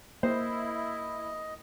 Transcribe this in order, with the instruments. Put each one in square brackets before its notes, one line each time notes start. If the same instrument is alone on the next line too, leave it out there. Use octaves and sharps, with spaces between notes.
[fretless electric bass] A#3 [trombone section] E4 [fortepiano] C5 [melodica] D#5